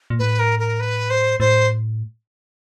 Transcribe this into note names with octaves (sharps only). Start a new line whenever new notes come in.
A#2
A2 B4
A#4
A#4
B4
C5
A2 C5